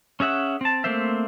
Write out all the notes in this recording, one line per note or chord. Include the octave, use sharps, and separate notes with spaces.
C#4 G#4 E5 F#5
C4 A5
A3 A#3 C4 C5 E5